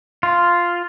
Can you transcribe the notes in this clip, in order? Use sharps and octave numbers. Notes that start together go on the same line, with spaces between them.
F4